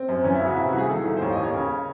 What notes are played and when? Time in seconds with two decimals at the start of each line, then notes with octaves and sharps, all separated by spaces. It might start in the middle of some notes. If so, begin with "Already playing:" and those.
Already playing: C4
0.09 F#2
0.24 E3 C#4
0.35 E4
0.41 C#3
0.46 F#4
0.56 C3 E4
0.68 F#4
0.73 C2
0.78 G#4
0.89 D#3 A4
1.05 C2
1.17 C5
1.22 D#2 C#5
1.32 D#5
1.38 D#2
1.44 C#5
1.54 C#3